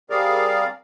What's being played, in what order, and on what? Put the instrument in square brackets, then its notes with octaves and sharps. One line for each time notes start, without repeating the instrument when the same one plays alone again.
[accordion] G3 C4 G#4 A#4 D5 F5